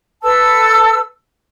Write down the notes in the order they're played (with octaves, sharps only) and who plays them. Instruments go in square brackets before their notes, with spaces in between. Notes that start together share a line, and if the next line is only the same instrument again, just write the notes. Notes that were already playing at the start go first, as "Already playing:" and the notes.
[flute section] A4 B4 A5 E6